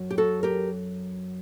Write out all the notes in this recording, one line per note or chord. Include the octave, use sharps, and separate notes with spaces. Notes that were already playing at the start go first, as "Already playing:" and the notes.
Already playing: F#2 F#3
G4
F#4 A4
G4 A#4